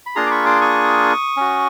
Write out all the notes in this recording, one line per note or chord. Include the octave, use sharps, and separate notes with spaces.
B5
A#3 D4 F4 G#4 A#5 C6
D6
B5 C#6
C6 D6
C#6 D#6
C#4 F#4